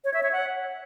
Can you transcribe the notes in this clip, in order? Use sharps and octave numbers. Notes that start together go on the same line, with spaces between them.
C#5
E5
C#5
F#5